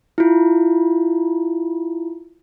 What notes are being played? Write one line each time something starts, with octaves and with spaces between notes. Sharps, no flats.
E4 F4